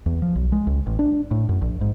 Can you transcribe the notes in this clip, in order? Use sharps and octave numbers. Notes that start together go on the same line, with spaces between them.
E2
F3
B1
G#3
C#2
A1
D4
A2
F#2
A#1
G#2